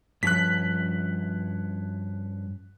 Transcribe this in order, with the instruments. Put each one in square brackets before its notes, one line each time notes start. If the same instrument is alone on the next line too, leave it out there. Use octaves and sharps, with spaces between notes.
[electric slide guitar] G2 F3 C#4 [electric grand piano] F#6 B6